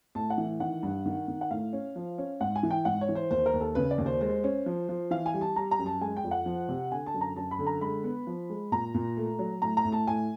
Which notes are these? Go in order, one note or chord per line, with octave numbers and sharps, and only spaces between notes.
A2 A5
F#5
E3
D#3 F#5
G2
D#3
D#3
F#5
A2 F5
C#4
F3
C#4
G#2 F#5
G#5
E3
G5
G#2 F#5
C#5
E3
C5
D#2 C5
A#4
D#2
A4
C#3 B4
D5
D#2
C5
G#3 C5
C#4
F3
F3
E3 F5
G#5
G3
A5
G3 A#5
A#5
F#2
A5
G#3 G#5
G5
F2
F#5
F3
C3
D3 G#5
A5
F#2
A#5
F#2 A5
B5
D3
A#5
G#3 B5
B3
F3
G#3
A#2 A#5
A#2
A3
F#3
A2 A#5
A#5
A2
A5
A2 G#5